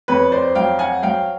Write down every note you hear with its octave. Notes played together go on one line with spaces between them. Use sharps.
F2 B4 C#5
C5 D5
F#3 F5 G5
F#5 G#5
F#3 F5 G5